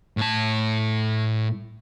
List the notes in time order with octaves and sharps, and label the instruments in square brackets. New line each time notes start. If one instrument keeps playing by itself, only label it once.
[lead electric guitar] A2 A5